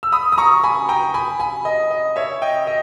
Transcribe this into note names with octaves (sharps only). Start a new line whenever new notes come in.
E6
B5 D#6
D#6
A#5 C#6
G#5 B5
G5 A#5
G#5 B5
G#5 B5
D#5
D#5
C#5 E5
D#5 G5
D#5